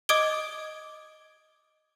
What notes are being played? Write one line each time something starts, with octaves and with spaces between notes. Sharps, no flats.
D#5 D6 D#6 G#6 D7 G7